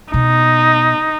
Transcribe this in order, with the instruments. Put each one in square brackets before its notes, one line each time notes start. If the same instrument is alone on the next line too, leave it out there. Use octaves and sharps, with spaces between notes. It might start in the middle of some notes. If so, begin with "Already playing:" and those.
[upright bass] B2 [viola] D#4